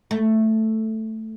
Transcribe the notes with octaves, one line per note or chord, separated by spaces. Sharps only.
A3